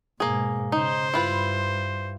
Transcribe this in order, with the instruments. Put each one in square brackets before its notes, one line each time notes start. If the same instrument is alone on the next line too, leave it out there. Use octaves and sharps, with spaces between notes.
[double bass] G#2 B2 [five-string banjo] A#3 G#4
[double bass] C#3 [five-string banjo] D#4 [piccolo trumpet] C5
[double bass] G2 [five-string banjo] E4 F4 B4